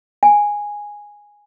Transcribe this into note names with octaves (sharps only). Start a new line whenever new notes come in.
G#5